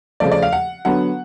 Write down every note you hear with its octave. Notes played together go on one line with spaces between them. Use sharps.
C#3 F3 A3 D5
D5
F5
F#5
D3 F#3 B3 F#5